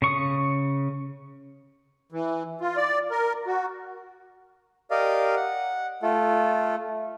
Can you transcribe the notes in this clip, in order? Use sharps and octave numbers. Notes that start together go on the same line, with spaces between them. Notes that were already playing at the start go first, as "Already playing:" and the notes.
C#3 C#6 D#6
E3
F4
D5
A#4
F#4
G4 A#4 D5 D#5 F5
F#5
A3 F4 A4